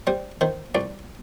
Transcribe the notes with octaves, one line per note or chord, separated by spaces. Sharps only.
G3 C5
D#3 C5
C2 D5